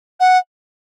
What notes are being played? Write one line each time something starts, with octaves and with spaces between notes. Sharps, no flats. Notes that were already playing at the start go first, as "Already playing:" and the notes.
F#5